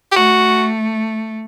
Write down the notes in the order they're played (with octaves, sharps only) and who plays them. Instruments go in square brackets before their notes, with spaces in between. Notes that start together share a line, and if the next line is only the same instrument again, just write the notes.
[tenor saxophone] G4
[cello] A3 [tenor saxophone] F#4